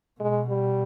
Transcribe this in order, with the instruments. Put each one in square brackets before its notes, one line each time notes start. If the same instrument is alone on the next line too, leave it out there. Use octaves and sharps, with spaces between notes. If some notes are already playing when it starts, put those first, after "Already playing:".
[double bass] B2 [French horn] G#3
[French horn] G3